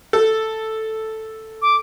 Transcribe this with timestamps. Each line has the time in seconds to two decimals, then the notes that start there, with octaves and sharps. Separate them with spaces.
0.13 A4
1.62 D6